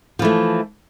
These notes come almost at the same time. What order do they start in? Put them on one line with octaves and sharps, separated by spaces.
F3 E3 A3